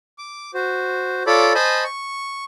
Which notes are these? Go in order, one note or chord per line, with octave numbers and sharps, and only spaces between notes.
D6
F#4 C5
F4 A4 C#5 D5 B5 D6
C5 D#5 G#5 A5 B5
C#6